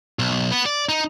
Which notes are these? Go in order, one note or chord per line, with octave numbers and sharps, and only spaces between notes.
B1
B3
D5
D#4